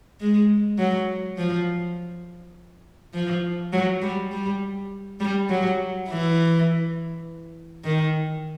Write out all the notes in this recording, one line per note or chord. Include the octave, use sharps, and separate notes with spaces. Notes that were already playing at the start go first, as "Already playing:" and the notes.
G#3
F#3
F3
F3
F#3
G3
G3
G3
F#3
E3
D#3